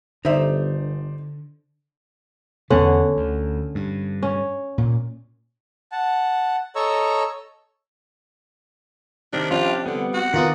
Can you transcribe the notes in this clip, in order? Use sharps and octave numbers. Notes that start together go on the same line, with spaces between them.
G1 D3 D#4 C5 D5 E5
E2 D3 B3 C#4 F#5
D2
G2
C#4
A#2
F#5 A5
A4 C#5 D#5 A#5 C#6 E6
C3 D#3 D4
F3 C#4 D4 F4 G4
D3 G3 B3
F#4
D#3 B3 F4 A#4 D5 D#6